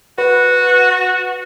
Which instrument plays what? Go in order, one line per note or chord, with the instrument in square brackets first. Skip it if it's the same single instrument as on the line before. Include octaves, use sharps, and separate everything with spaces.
[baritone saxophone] F#4 [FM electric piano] B4